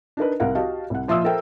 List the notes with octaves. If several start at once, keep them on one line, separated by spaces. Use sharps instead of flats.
D4 D#4 A#4 B4
C2 A#4 F5 F#5
F#4 G4 D#5 F5 A5
C2 F#5
A#2 F3 F4 E5 D#6 E6
F4 A4 A#4 C5 E5 G5